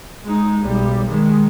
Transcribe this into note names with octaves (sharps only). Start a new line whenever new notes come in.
G#3 D#4
B1 G3
D#3 G#3